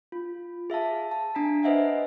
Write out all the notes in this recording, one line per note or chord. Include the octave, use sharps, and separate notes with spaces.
F4
G#4 E5 F5 A5
A5
D4 G#5 A#5 B6
B4 C5 D#5 E5 F#5 G#5